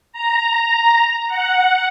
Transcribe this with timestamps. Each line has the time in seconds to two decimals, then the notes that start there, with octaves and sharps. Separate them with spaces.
0.12 A#5
1.28 F#5